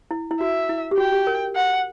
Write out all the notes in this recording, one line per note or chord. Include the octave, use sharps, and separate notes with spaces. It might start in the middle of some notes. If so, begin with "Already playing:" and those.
E4
E4
F#4 E5
E4
G4
F#4 G5
G4
A#4
F#5